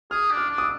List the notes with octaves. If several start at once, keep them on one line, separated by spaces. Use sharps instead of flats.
G#4 F6
D4
F6
D4
D#6
E6